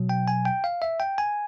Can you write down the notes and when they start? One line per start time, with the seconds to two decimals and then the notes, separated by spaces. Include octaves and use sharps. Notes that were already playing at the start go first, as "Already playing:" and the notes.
Already playing: B2 F#3
0.09 G5
0.28 G#5
0.45 G5
0.64 F5
0.82 E5
1.00 G5
1.18 G#5